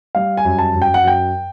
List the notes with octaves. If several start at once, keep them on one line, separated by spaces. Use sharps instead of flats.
G3 F5
G#5
F#2
A5
F#2
G5
F#5
F#2 G5